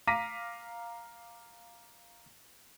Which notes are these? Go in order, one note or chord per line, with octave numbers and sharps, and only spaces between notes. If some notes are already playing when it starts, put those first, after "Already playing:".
F5 A#5 D6 A#6 B6 D#7